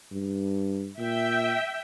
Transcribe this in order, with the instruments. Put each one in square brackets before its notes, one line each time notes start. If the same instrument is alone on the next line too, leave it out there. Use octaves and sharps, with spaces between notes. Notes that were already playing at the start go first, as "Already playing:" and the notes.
[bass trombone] G2
[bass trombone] A#2 [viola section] E5 G5